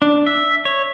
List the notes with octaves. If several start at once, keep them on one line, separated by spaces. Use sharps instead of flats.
D4
E5
C#5